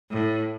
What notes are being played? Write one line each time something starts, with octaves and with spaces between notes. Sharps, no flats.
A2